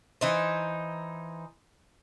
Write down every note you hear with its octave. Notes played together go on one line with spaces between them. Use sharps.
E3 D#4 C5